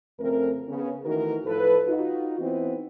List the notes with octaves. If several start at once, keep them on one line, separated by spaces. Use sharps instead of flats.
F2 C#3 A3 C4 A#4
C#3 B3 C#4
D#3 E3 A3 D#4 F#4 A#4
A2 F3 A4 B4
D#4 F4 F#4
E3 B3 C4 D#4